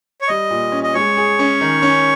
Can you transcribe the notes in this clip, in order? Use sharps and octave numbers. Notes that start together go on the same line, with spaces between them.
C#5
G3 D#5
A#2
C#4
D#5
G#3 C#5
G#4
C#4
D#3
C#4